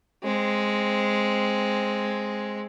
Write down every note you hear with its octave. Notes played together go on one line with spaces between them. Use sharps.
G#3 C4